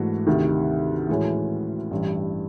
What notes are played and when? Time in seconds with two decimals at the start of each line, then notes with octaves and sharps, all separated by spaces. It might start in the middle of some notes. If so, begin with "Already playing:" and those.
Already playing: G#2 E3 A3 D4 F#4
0.27 D2 C3 D#3
1.09 A2 E3 G#3 C#4 F#4
1.91 A1 G2 E3